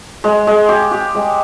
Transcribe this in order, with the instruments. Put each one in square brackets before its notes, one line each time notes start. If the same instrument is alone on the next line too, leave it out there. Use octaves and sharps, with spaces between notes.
[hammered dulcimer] G#3
G#3
G4
G4
G#3